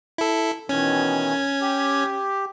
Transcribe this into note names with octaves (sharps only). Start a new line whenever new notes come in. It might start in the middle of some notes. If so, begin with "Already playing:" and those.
E4 A4
B2 D#3 E3 C#4 G#6
G4